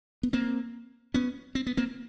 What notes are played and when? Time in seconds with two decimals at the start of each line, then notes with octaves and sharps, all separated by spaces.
0.23 B3
0.33 A#3 C4
1.14 B3 C#4
1.55 C4
1.67 B3
1.77 A#3 C4